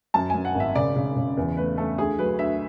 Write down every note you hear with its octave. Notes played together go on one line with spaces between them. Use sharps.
F#2 A5
F#2 G#5
F#5
G#1
E5
C#3 D5
C#3
C#3
E2
A3 B4
A3 A4
D2 G#4
F#3 B4
D2 E5